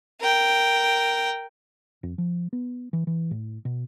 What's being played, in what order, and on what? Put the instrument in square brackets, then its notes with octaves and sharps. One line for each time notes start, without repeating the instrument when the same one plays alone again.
[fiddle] A#4 G5
[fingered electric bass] F2
F3
B3
E3
E3
A2
B2